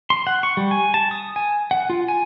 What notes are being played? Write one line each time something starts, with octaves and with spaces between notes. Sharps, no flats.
C6
F#5
C#6
G3
G#5
A5
D#6
G#5
F#5
F4
G#5